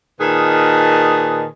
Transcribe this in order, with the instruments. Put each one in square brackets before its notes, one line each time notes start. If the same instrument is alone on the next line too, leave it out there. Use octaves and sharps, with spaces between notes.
[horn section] A#2 D#3 G#4 B4 D#5 A5